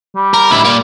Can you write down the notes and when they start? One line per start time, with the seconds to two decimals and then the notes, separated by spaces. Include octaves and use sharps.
0.16 G3
0.34 A#4
0.51 D2 E4
0.65 A#2 A#3